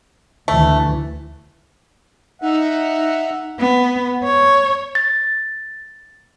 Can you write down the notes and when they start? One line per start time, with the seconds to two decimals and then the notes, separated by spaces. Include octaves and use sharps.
0.48 D2 E3 A3
2.42 D#4 E5 F#5
3.59 B3
4.24 C#5
4.95 A6